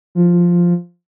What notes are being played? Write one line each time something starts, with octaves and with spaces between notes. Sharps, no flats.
F3